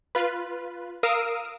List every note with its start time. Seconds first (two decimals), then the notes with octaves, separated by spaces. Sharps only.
0.15 F4 B4
1.03 A#4 F5 D#6 E6 D7